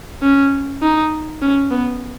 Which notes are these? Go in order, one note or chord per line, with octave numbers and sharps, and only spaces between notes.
C#4
D#4
C#4
B3